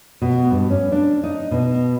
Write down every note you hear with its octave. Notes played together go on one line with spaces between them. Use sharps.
B2
G2
C#4
D4
D#4
B2